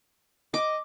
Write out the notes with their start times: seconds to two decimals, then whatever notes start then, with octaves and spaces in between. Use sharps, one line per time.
0.54 D#5 D6